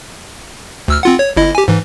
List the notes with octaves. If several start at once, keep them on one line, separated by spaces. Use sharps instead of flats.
D2 E6 F6
C4 F4 F#5
C#5
G1 E4 D#5
G4 G#5
G#2 E3